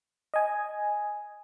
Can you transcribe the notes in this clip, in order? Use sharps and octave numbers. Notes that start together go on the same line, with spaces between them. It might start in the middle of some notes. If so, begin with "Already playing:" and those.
D#5 G#5